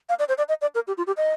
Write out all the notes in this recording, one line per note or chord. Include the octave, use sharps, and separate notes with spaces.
F5
D5
C5
D5
D#5
D5
A#4
G4
F4
G4
D#5